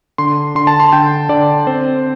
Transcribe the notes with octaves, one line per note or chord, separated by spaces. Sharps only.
D3 C6
D3 C6
A5
C6
D3 G5
D3 D5
C4 C5